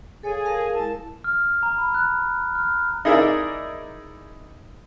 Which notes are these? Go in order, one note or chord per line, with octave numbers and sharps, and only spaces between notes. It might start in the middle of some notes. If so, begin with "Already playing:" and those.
G#4 A4 C#5 F5 G#5
A#4 F5 A5
G#3 E4 A#4 A5
F6
A#5
B5
F#6
F6
D#4 E4 G#4 A#4 D5 E5